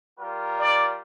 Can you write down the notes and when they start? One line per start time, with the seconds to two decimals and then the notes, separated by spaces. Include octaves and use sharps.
0.18 G3 F4 A#4
0.59 D5